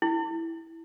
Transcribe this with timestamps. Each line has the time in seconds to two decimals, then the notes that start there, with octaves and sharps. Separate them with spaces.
0.02 E4